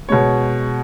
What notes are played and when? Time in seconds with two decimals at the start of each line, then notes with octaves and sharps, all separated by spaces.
0.09 B2 G#3 C#5